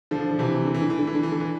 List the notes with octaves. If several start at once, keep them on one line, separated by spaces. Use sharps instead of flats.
D3 F3
D3
C3 E3
D3
E3
D3
E3
D3
E3
D3
E3
D3
E3